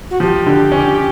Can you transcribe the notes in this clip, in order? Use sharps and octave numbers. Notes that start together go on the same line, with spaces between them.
F#4
F3 G4
D3
C#4